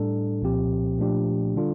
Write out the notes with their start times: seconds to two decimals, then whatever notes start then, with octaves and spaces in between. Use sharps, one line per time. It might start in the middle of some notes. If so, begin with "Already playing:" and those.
Already playing: A2 G3 D4 A4
0.42 C2 A#2 F3 C4 G4
0.99 A#2 F3 A3 D4 G4
1.55 D3 G3 D4 F4 A4